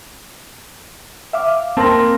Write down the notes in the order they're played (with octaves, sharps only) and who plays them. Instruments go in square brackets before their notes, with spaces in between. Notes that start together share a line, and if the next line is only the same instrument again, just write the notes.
[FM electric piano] E5 F5 D6
[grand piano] A#3 [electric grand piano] C4 [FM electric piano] A5 C6 A#6